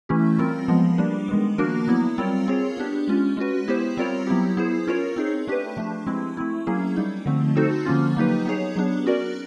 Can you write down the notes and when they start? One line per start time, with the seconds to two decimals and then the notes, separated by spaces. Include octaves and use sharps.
0.09 E3 A3 C#4 E4 G4
0.38 G3 C4 F4 A#4
0.68 F3 G#3 B3
0.98 G3 A#3 D4
1.28 D#3 G#3 B3
1.58 F3 A#3 D4 F#4 A#4
1.87 F#3 B3 E4
2.18 G3 C4 F4 A#4 C#5
2.48 C4 F4 G#4 C#5
2.77 B3 D4 G4
3.08 G#3 C#4 F4
3.37 G#3 C#4 F#4 B4
3.68 B3 E4 G4 C5
3.97 G3 C4 F4 A#4 C#5
4.27 F#3 B3 E4 G4
4.57 B3 E4 G#4 C5
4.87 C#4 F4 A#4 C#5
5.16 C4 D#4 G#4
5.47 A3 D4 G4 B4
5.77 F3 A3 D4
6.07 G#3 C4 E4
6.37 A3 C4 E4
6.67 F#3 A#3 C#4 E4 G#4
6.97 G3 A#3 D#4
7.26 D3 F3 A3 C4
7.56 C4 D#4 F#4 A4 C5
7.85 D3 F3 A#3 C#4 F4
8.16 F#3 A#3 D#4 G4 B4
8.45 B3 D#4 G#4 C#5
8.76 F#3 B3 D4
9.06 C#4 F#4 A#4 D5